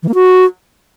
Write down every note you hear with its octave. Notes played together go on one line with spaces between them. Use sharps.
E3
A#3
F#4